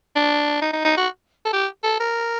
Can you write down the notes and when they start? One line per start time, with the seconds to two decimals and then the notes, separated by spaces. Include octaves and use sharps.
0.16 D4
0.62 D#4
0.73 D#4
0.85 D#4
0.97 F#4
1.45 A4
1.53 G4
1.84 A4
2.00 A#4